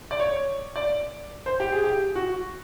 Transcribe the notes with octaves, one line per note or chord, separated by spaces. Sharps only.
D5
C#5
D5
C5
G4
G#4
G4
F#4